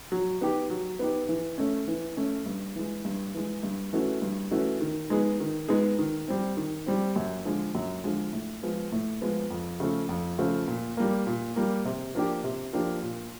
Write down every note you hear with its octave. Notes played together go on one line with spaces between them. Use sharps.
F#3
B3 D#4 G4
F#3
B3 D#4 G4
E3
A3 C#4
E3
A3 C#4
G2
E3 G#3
G2
E3 G#3
G2
E3 A3 C#4 F#4
G2
E3 A3 C#4 F#4
D#3
G#3 B3 D#4 G#4
D#3
G#3 B3 D#4 G#4
D#3
G3 C4
D#3
G3 C4
F#2
D3 F3 G#3
F#2
D3 F3 G#3
A2
F3 G#3 B3
A2
F3 G#3 B3
F2
C#3 F3 A3
F2
C#3 F3 A3
A#2
G3 A#3
A#2
G3 A#3
C3
F3 A#3 D4 G4
C3
F3 A#3 D4 G4
A#2